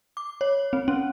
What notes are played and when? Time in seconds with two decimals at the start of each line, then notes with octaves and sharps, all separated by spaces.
0.17 D6
0.41 C#5
0.73 C4
0.88 C#4